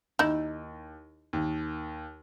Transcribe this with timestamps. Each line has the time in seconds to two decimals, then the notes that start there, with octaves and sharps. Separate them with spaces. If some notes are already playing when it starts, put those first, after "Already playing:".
0.19 D#2 D#4 E4
1.33 D#2